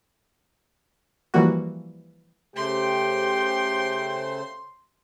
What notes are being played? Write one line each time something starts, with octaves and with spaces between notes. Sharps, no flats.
E3 F3 G3 A#3 F#4
C#3 A3 G4 C5 G5 C6